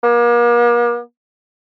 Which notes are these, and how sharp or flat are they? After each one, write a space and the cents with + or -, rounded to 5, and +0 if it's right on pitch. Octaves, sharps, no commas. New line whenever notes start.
A#3 +40